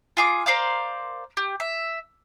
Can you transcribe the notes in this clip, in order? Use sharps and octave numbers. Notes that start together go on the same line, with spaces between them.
F4 G#4 D6
A#4 C5 D5 F5
G4
E5